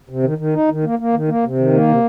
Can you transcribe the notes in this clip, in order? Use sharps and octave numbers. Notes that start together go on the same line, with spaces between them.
C3
D#3
D#3
D#4
D#3
A#3
A#3
D#3
A#3
C3
D#3
A#3
C3